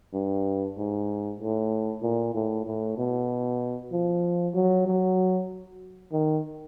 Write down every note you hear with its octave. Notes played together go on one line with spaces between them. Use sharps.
G2
G#2
A2
A#2
A2
A2
B2
F3
F#3
F#3
D#3